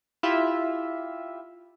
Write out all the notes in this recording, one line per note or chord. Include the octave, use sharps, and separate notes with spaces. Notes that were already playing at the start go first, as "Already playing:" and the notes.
E4 F4 G4 E5